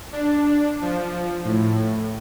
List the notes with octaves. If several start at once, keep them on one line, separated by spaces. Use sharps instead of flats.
D4
F3
A2